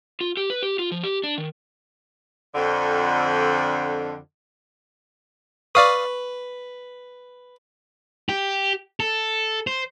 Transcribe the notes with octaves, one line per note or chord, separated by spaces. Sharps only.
F4
G4
B4
G4
F4
F3
G4
D4
D#3
F2 D3
B4 D5 F5 C#6 D#6
G4
A4
C5